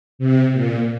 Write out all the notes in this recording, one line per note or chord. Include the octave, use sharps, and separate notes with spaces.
C3
A#2